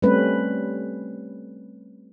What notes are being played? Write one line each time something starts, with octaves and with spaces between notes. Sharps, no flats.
G3 A3 C4 C#4 B4